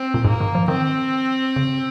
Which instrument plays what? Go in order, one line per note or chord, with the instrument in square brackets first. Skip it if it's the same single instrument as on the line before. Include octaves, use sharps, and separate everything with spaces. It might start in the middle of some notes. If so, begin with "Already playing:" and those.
Already playing: [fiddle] C4
[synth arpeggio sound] A#2
[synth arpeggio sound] G#2 [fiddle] A#3
[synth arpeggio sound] D#3
F3
[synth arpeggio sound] D#3 [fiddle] C4
[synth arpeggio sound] C#3